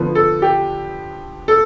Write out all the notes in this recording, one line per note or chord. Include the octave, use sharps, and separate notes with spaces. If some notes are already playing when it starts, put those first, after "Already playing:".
Already playing: D3 F3 B3
A4
G4
A4